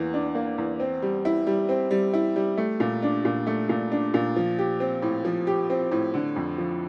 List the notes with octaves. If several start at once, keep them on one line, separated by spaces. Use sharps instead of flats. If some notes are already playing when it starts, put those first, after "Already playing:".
Already playing: E2 E3 A#3
D4
A#3
E2
C4
G3
E4
G3
C4
G3
E4
G3
A3
A#2
D4
A#2
A3
A#2
D4
A#2
F3
G4
C4
A2
F3
G4
C4
A2
D3
F2
F3